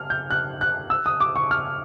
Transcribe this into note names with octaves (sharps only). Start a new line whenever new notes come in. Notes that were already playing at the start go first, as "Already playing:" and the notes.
Already playing: F6
G6
F#6
F#6
E6
D#6
D6
C#6
F6